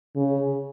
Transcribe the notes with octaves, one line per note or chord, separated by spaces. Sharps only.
C#3